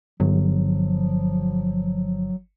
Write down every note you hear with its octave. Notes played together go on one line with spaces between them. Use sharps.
G1 F3 F#3